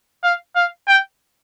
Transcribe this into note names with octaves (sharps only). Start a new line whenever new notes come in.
F5
F5
G5